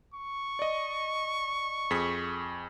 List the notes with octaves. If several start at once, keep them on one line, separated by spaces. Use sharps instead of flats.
C#6
D5 D#5
F2 G#4 B6